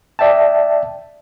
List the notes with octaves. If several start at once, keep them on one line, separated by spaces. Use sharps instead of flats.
D5 E5 G5 A5